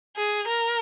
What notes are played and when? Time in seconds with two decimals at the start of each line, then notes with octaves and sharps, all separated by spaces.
0.16 G#4
0.48 A#4